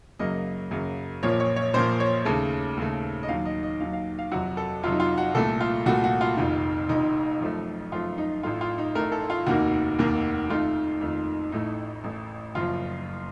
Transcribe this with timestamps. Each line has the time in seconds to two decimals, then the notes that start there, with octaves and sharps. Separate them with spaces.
0.19 F#2 C#3 F#3 A#3 D#5
0.71 F#2 C#3 F#3 A#3
1.23 A#1 A#2 F3 A#3 C#5
1.40 C#5
1.56 C#5
1.74 A#1 A#2 F3 A#3 C5
2.00 C#5
2.25 D#2 C#3 A3 A5
2.77 D#2 C#3 A3
3.23 D#5
3.29 D#2 D#3 F#3 F5
3.45 D#5
3.63 D#5
3.80 D#2 D#3 F#3 F5
3.93 F5
4.19 F5
4.31 F2 C3 F#3 F#4
4.57 A4
4.83 F2 C3 F#3 F4
4.92 D#4
5.00 F4
5.17 F#4
5.35 C2 A#2 A3 A4
5.61 F4
5.86 C2 A#2 A3 F#4
6.04 F#4
6.21 F4
6.37 F1 F2 D#3
6.89 F1 F2 D#3 D#4
7.41 F#2 F3 A3
7.92 F#2 F3 A3 F4
8.18 D#4
8.43 A1 A2 A3 F4
8.61 F4
8.78 D#4
8.95 A1 A2 A3 A#4
9.12 A4
9.30 F4
9.46 F1 D#2 D#3 A#3 F#4
9.99 F1 D#2 D#3 A#3
10.50 F2 D#3 A3 F4
11.01 F2 D#3 A3
11.52 A1 A2 A3 D#4
12.04 A1 A2 A3
12.55 F#1 F#2 F3 F4